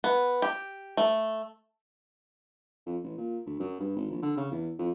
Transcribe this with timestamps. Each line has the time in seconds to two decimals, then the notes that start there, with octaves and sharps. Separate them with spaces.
0.04 B3
0.42 G4
0.97 A3
2.86 F2
3.03 A1
3.18 A#2
3.46 D2
3.59 F#2
3.80 G2
3.96 G#1
4.11 A#1
4.22 D3
4.37 C#3
4.51 E2
4.79 F2